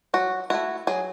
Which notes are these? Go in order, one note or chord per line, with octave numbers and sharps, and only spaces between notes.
F#3 F#4
A3 E4 F#4
F#3 G#4